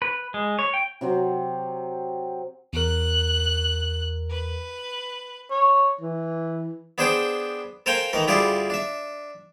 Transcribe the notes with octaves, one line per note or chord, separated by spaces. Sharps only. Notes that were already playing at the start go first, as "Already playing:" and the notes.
B4
G#3
C#5
G5
C3 F#3 C4
E2 A#4 F#6
B4
C#5
E3
B3 D4 G#4 C5 G5 A5
A4 A#4 C5 F5 G5 G#5
D#3 E3 A3 A#4
D2 G3 E4 F4 G#4 D5
D4 E5